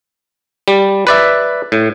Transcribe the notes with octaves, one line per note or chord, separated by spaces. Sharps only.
G3
B4 D5 E5
A2